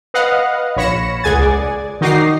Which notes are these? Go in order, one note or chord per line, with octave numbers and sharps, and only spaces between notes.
B4 D#5 F5 F#5
A#1 C#5 B5 A#6 C#7 E7
C#2 G#4 F#5 G#5 G#6 A6
D5
D#3 D#4 F#4 D6 A#6 C7